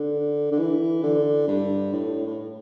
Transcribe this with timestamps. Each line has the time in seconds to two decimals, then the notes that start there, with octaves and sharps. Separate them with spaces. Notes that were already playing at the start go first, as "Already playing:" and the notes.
Already playing: D3
0.52 D3
0.59 E3
1.03 D3
1.48 G2
1.93 A2
2.27 A2